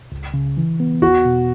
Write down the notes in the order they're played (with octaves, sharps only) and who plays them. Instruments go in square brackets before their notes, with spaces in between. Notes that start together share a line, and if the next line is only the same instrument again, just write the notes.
[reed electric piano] C#2
C#3
E3
B3
[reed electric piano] E2 [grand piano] F#4
[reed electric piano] B2